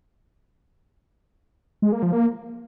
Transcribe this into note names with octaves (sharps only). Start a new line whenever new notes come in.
G#3
A#3
F3
A#3